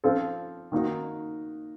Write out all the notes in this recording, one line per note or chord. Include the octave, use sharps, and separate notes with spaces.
F3 C4 F4 A4
D#3 A#3 D#4 F#4